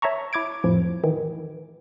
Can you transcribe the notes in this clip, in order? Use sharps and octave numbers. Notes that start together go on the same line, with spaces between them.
C#5 E5 A5 A#5 C#6
E4 D6 G#6 D7
F2 A2 F3
D#3 E3